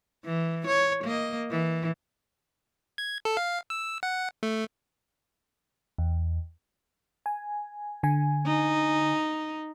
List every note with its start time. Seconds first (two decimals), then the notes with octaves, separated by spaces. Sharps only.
0.24 E3
0.67 C#5
1.04 A#3 D#5
1.51 E3
2.98 G#6
3.25 A4
3.37 F5
3.70 E6
4.03 F#5
4.43 A3
5.98 E2
7.26 G#5
8.03 D3 G#5
8.46 D#4